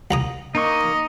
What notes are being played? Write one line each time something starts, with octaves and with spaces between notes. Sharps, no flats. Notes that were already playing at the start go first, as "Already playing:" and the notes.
C2 A#5 D#6
A#3 D#4 D#5 C#6